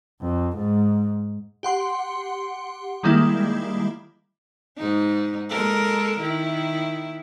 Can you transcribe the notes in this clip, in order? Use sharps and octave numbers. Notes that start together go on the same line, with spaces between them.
F2
G#2
G4 F#5 C6
D#3 G3 G#3 A#3 E4
G#2 D#4
G#3 A4 A#4
D#3 E4